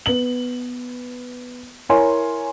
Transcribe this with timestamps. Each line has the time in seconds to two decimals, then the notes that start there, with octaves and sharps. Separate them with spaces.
0.06 B3 F#7
1.89 E4 A#4 C#5 G#5 C6